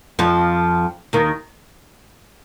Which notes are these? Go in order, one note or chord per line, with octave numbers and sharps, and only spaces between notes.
F2 F3
D#2 D#3